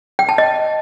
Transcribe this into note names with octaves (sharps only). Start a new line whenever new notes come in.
G5
A5
D#5